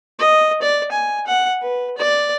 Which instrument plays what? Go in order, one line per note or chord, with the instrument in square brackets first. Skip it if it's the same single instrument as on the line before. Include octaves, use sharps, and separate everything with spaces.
[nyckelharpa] D#5
D5
G#5
F#5
B4
D5